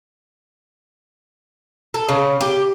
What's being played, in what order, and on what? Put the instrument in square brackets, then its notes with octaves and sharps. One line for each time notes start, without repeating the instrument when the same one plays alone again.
[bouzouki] A4
C#3
G4